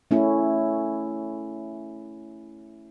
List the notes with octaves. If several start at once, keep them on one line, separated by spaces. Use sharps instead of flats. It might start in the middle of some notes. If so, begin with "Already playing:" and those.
A3 C#4 E4